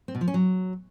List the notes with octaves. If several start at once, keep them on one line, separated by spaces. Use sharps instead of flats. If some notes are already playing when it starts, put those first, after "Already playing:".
C4
B2
F3
C#4
F#3